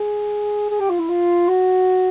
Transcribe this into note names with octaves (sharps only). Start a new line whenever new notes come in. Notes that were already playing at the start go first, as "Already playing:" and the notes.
Already playing: G#4
G#4
G4
F4
E4
F4
F#4